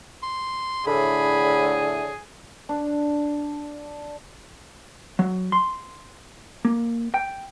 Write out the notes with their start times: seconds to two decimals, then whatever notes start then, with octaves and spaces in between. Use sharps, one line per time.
0.23 C6
0.87 A2 D3 G#4 B5
2.69 D4
5.19 F#3
5.52 C6
6.65 A#3
7.14 G5